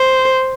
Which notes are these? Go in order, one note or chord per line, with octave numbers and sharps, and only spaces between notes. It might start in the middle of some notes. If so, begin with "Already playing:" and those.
Already playing: C5